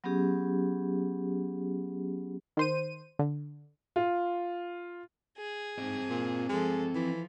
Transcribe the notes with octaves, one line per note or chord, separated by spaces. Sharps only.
F#3 B3 C#4 G4 G#4
D#3 C5 D#7
D3
F4
G#4
G#2 C4 D#5
A#2
F3 G#3 A4
E3 F3